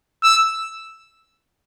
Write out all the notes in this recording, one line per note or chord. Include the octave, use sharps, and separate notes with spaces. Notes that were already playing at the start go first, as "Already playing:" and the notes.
E6